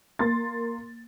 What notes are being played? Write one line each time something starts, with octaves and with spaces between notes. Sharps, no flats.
A#3 C6 A6